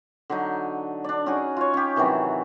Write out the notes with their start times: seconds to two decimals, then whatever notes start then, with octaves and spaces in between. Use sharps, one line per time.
0.30 D3 F#3 D#4
1.04 D4 D5
1.26 C#4 D#4 F#4 G#4
1.57 F4 C#5
1.74 C#4 G4
1.96 C3 D#3 E3 F#3